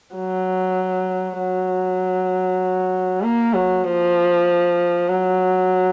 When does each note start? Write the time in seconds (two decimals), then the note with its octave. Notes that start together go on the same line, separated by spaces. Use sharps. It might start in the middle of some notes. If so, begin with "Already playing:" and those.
0.15 F#3
1.39 F#3
3.22 A#3
3.54 F#3
3.84 F3
5.08 F#3